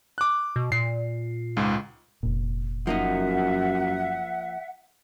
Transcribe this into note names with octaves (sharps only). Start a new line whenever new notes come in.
D6 F#6
B2
A#2 C7
C#2 G#2
F1 A#2
F#2 F3 A#3 D#4 E5 F#5